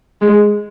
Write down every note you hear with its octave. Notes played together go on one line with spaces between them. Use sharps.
G#3